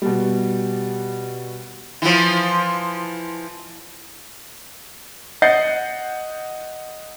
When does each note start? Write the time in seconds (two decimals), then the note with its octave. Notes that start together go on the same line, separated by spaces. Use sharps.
0.02 B2 G3
2.02 E3 F3
5.42 D#5 F#5 G6 A6 C7